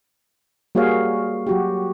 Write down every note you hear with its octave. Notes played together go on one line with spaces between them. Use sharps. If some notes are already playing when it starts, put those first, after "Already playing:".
G3 A#3 F#4 G#4 C#5 F5
F#3 F#4 G4